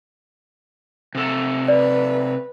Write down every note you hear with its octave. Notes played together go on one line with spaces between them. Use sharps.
C3 A4
B4 D5